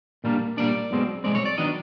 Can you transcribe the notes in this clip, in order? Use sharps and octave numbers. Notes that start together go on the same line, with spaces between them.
A#2 G3 A#3 D4
A#2 G3 A#3 D4 D5
B1 B2 G#3 C4
B1 B2 G#3 C4 D5
C#5
D5
D#3 F#3 B3 D4 D#5